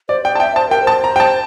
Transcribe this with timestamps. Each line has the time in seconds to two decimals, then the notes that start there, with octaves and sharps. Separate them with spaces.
0.09 C5 D5
0.24 D5 G5
0.35 A5
0.40 E5 G5
0.55 C5 A5
0.70 A#4 G5
0.84 C5 A5
1.04 A#5
1.16 G5
1.20 A5